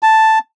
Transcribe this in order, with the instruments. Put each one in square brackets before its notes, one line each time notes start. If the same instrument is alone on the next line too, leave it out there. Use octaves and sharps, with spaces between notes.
[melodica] A5